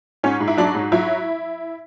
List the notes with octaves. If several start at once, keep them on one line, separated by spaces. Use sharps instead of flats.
G#2 C#4
G#2
E4
F#3 D4
G#2
F#3 E4